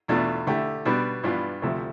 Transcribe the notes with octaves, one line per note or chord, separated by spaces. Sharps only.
E2 B2 A3 D4 F4
D3 A3 E4 G4
B2 G3 B3 D4
G2 E3 B3 D4 F4
D2 C3 F3 A3